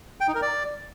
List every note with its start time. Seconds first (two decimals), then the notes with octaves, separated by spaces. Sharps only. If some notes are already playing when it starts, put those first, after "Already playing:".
0.21 G5
0.28 D#4
0.35 A#4
0.42 D5